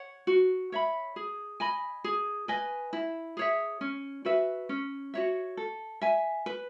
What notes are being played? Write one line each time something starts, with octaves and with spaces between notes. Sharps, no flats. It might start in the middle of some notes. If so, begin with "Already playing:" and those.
Already playing: C#5 F#5
F#4
C#5 E5 B5
G#4
D#5 G#5 B5
G#4
B4 D#5 G#5
E4
G#4 C#5 E5
C#4
F#4 B4 E5
C#4
F#4 C#5 E5
A4
E5 G#5
B4